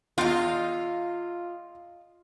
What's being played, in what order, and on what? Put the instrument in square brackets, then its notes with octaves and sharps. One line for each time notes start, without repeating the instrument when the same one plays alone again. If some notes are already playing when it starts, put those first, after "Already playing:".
[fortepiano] E2 G5 C6 [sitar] F4 [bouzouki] D#5 F5